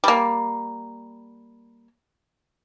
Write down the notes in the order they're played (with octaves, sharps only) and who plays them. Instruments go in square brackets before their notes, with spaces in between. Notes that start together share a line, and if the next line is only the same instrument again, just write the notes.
[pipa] G3 A#3